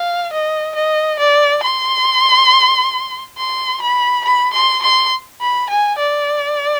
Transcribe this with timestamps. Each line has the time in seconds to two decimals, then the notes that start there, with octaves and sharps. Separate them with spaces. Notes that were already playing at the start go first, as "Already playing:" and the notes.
Already playing: F5
0.33 D#5
0.75 D#5
1.19 D5
1.63 C6
3.38 C6
3.81 B5
4.24 B5
4.53 C6
4.82 C6
5.41 B5
5.70 G#5
5.99 D5